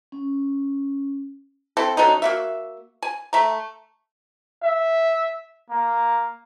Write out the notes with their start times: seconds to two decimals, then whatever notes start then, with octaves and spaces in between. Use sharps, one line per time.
0.12 C#4
1.77 C4 E4 A4
1.97 D3 F#3 C#4 D#4
2.22 A#3 F#4 E5
3.02 G#5
3.33 A3 E5 A#5
4.63 E5
5.70 A#3